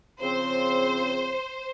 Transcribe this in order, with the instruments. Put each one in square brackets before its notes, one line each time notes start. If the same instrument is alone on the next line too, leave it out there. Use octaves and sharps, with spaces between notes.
[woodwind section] C#3 F3 C4 [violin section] C5